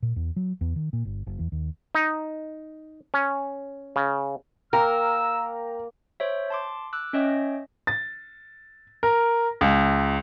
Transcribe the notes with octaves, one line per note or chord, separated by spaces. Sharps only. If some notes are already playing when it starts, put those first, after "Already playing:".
A#2
E2
F#3
E2
D#3
A#2
G1
F#1
E2
D#2
D#4
C#4
C#3
A#3 A#4 G5 A#5 E6
C5 C#5 E5
A5 C6 D6
D6 E6 F#6
C#4 C#5 D#5 E5 G5 A#6
A6
A#4
C#2